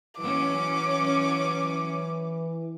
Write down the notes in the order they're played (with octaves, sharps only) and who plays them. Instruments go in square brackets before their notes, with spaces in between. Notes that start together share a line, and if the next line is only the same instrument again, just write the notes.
[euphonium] E3 [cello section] F#3 C#4 [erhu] D6